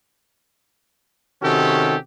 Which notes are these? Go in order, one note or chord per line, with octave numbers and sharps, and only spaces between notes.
C3 D#3 C#4 F#4 G4 A4